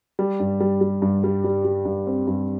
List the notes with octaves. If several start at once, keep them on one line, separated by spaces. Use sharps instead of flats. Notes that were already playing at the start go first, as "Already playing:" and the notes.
G3
G2
G3
G3
G2
G3
G3
G3
G2
C4
G2